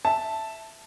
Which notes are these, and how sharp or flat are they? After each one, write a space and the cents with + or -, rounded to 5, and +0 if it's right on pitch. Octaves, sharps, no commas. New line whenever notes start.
E5 +0 A5 +0